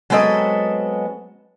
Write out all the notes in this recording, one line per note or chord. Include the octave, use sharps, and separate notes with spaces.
F#3 G#3 B3 C4 A4 D#5